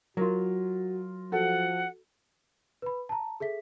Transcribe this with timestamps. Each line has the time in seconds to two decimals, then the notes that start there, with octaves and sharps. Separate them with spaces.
0.17 F#3 F4 F#4 A#4
1.32 F3 F#4 A4 F#5
2.82 B4 B5
3.09 A5 A#5
3.40 G#4 A4 E5 B6